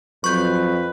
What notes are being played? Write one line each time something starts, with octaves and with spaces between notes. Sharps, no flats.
F2 F#3 B4 C#6 G6